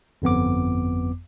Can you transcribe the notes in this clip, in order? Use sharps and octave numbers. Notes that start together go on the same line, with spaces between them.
G1 F2 B3 D6